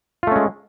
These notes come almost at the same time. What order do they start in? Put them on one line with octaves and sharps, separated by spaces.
F4 A3 C#4 G#3